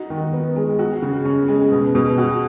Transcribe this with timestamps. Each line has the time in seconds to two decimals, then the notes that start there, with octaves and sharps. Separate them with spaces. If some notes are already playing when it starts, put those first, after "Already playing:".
Already playing: D#4 F#4
0.10 D#3
0.33 B3
0.56 G#3
0.79 F#4
1.02 C#3
1.25 C#4
1.48 G#3
1.72 B2
1.95 B2
2.18 F#4